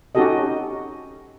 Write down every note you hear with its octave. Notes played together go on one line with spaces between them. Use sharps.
C#4 D#4 F#4 G4 A4 D#5